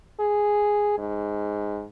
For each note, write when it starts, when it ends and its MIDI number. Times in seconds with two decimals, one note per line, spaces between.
0.20 0.96 68
0.98 1.86 44